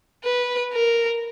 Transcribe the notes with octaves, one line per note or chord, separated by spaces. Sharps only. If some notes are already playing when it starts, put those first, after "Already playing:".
B4
A#4